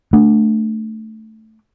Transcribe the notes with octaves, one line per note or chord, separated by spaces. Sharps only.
A3 D4